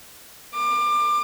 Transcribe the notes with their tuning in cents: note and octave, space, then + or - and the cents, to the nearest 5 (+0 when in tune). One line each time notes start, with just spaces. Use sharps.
D6 +25